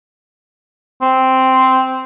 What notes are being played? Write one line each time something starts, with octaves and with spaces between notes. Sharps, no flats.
C4